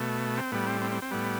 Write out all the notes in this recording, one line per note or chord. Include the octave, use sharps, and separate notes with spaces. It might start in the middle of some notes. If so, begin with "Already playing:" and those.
Already playing: B2 A3
C4
A2 G3 B3
C4
C4
C4
C4
A2 G3 B3